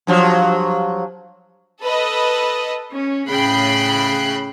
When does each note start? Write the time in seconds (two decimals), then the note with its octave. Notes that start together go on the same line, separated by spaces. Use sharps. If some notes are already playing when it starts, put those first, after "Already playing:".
0.07 G2 F3 F#3
1.81 A4 B4 D#5
2.91 C#4
3.29 A2 C#3 G5 B5 F#6 C7